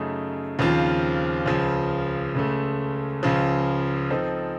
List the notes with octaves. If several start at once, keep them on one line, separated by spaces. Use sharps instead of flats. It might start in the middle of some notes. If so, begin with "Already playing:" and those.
Already playing: F#2 C#3 A3 D#4
D#2 C#3 F3 C4 F4
C#2 C#3 F3
C#2 C#3 A3
C#2 C#3 F3
F3 C4 D#4 A4